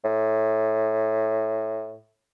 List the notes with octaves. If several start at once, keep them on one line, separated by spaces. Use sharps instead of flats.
A2